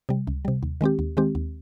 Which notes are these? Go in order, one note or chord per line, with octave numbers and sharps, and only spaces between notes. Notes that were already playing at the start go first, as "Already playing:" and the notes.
C3 G3
C#2
C3 G3
D#2
D#3 G#3 C4 G4
D#2
D#3 G#3 C4 G4
D#2